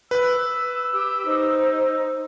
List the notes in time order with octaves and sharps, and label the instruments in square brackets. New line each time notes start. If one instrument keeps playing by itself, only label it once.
[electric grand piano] B4 F#6 [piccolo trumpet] E6
[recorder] G4
[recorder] D#4 [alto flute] C5